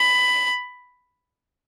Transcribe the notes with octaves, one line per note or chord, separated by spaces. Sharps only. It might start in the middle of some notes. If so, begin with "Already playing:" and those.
Already playing: B5